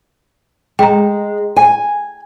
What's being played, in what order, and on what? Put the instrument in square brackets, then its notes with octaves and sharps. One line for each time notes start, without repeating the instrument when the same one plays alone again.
[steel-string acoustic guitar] G#3 [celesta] G5 A#5
[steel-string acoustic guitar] G#5